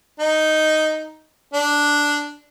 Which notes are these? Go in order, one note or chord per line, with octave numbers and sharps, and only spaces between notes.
D#4
D4